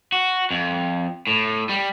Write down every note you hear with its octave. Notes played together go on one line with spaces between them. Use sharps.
F#4
F2
A2
G3